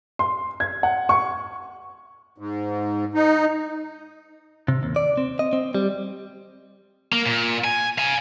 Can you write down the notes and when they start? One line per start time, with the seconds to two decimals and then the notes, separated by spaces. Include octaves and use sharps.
0.19 C6
0.60 G#6
0.83 F#5
1.09 C#6
2.38 G#2
3.14 D#4
4.68 C3
4.83 D#2
4.96 D5
5.17 C4
5.39 D#5
5.53 C4
5.75 G3
7.13 A#3
7.26 A#2
7.64 G#5
7.98 F5 G#5